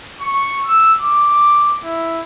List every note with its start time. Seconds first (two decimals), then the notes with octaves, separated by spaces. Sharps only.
0.21 C#6
0.66 E6
1.00 D6
1.84 E4